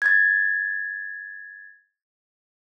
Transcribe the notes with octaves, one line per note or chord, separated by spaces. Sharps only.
G#6 A6